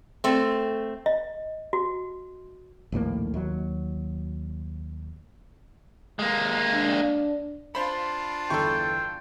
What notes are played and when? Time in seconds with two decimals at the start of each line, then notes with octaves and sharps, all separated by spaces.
0.24 A3 C4
1.06 D#5
1.73 F#4
2.92 A#1 D#2 A2 A#3
3.34 D#2 F#3
6.19 G#3 A#3
6.74 D4
7.75 D4 F4 C5 B5
8.50 G1 E2 A4 G5 B5 C#6